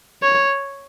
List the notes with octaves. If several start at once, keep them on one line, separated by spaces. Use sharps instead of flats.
C#5